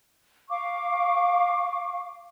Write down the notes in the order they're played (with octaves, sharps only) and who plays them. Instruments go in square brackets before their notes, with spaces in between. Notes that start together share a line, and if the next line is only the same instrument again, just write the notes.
[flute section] F5 C#6 D6